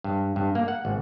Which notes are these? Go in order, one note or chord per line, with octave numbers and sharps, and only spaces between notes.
G2
G2
A#3
F#5
G#1